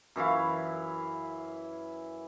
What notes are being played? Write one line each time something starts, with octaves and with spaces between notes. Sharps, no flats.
F#2 E3 E4 F5